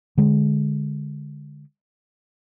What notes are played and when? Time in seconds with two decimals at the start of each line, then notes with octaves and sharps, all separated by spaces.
0.17 D3 G#3